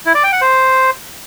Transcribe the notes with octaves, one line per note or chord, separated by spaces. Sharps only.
E4
D5
G5
F#5
C5